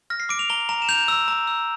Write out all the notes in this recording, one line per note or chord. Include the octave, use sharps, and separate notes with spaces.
F6 A#6
C7
D6 D7
F7
A#5 G7
A#5 F7
E7
G6 F7
E6
A#5
E6